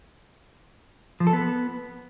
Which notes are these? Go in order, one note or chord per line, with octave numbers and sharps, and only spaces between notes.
F3
A4
B3